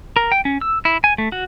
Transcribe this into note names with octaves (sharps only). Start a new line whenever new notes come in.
A#4
G5
C#4
E6
E4
G#5
A3
F#4